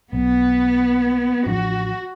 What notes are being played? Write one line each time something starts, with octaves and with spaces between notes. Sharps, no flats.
B1 B3
A1 F3 D4 F#4